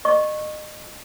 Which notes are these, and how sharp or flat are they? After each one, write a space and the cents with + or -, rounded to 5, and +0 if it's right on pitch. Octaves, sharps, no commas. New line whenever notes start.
D#5 -30 C#6 -20